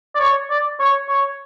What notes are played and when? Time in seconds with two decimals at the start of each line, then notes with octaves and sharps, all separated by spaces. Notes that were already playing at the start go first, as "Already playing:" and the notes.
0.15 D5
0.19 C#5
0.50 D5
0.80 C#5
1.09 C#5